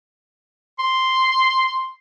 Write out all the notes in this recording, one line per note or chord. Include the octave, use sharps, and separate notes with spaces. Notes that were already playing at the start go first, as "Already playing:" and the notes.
C6